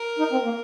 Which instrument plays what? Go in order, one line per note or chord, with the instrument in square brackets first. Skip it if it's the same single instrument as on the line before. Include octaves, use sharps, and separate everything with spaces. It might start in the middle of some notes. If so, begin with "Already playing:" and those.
Already playing: [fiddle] A#4
[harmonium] D#4
C4
A#3